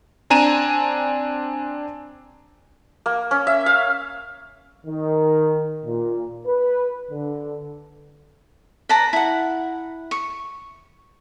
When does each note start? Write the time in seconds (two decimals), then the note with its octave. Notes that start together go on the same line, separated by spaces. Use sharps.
0.30 C4 D4 G#5 A#5 D#7 E7
3.06 A#3
3.31 C#4
3.47 E5
3.66 F5
4.86 D#3
5.85 A#2
6.47 B4
7.11 D3
8.89 B4 D5 A5 A#5
9.13 E4 F#5
10.11 C#6